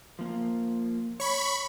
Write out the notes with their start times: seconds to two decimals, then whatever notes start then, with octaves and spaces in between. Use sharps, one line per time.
0.19 F3 A#3
1.20 C#5 B5 C#6